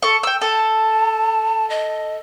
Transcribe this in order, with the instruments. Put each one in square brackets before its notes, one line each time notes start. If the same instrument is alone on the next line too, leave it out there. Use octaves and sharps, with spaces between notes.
[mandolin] A4 C#6
G5 E6
[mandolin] A4 [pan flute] A5
[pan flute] D#5